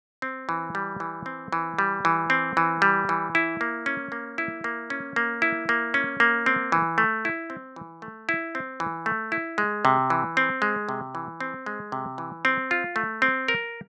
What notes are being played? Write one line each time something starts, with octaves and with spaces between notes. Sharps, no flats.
C4
E3
G3
E3
C4
E3
G3
E3
C4
E3
G3
E3
E4
A#3
C#4
A#3
E4
A#3
C#4
A#3
E4
A#3
C#4
A#3
C4
E3
A3
E4
C4
E3
A3
E4
C4
E3
A3
E4
G#3
C3
E3
C4
G#3
C3
E3
C4
G#3
C3
E3
C4
F4
A3
C4
A#4